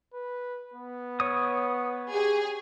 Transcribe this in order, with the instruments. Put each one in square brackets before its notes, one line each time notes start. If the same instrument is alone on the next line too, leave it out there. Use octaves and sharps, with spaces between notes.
[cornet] B4
B3
[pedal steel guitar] C#5 D#6
[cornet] G4 [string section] G#4